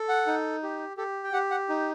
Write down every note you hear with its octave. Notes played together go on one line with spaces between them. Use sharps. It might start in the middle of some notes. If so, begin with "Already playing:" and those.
Already playing: A4
F#5
D#4
G4
G4 A4
G5
G4 F#5
F#5
D#4